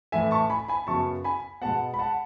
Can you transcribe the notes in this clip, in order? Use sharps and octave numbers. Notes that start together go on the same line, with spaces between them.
A2 E3 A3 E5 G#5
A5 C#6
G#5 B5
G#5 B5
F#2 C#3 F#3 B3 A5 C#6
G#5 B5
B2 G#3 B3 F#5 A5
B5
F#5 A5